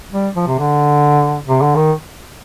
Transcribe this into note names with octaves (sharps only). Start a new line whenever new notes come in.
G3
F3
C3
D3
C3
D3
D#3